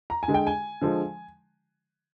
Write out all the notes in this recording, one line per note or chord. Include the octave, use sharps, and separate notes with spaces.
A#5
G#5
D3 G#3
G5
G#5
D3 F3 G#3